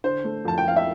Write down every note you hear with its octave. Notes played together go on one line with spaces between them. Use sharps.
D3 C5
A3
F2 A5
G5
F3 F5
E5